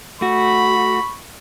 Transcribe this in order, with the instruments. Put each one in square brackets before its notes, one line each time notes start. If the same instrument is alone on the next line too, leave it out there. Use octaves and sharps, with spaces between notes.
[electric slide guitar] A3 F#4 [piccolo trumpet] B5 [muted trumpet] C#6